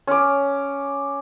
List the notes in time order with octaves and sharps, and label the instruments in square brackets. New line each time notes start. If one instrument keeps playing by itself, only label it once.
[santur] C#4 D6